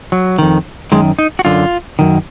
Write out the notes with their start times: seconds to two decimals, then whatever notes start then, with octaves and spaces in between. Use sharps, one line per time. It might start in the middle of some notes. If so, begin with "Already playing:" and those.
0.12 F#3
0.39 F2 D#3
0.92 F#2 D#3 G#3
1.19 D#4
1.39 F#4
1.45 F#2 D3 F4
1.99 F#2 D#3